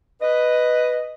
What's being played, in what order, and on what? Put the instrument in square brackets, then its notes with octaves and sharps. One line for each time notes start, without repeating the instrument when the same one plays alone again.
[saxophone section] B4 D#5